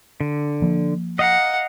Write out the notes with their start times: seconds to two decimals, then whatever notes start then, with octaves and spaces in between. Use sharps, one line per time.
0.21 D3
0.62 F3 A#3
1.19 D#5 F5 F#5 A#5